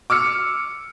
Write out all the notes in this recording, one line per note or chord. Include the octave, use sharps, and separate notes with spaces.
D6 E6 F6 C#7